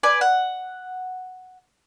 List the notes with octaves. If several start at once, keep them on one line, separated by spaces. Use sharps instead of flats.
B4 D5 G#5
F#5